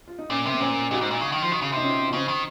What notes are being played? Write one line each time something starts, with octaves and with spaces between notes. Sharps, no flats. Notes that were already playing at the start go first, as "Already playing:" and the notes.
F4
D#4
A#2 A#3 C#4
C3
C4
A#2 A#3 C#4
A#2 D#4 F#4
G#2
A#2
C#3
D#3
F3
D#3
C#3
C3 D#4
C#4 F4
F4
C#3 C4 D#4
D#3